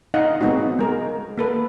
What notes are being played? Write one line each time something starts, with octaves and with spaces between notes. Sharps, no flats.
D#4 D#5 F5 F#5
G#3 B3 C4 D#4 F#4
G#3 A#4
A#3 A4 B4